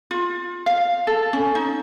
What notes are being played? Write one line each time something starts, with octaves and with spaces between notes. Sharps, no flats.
F4
F5
A4
C#4
D#4